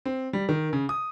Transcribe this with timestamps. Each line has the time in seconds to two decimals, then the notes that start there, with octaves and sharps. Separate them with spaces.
0.06 C4
0.33 G3
0.49 D#3
0.73 C#3
0.89 D#6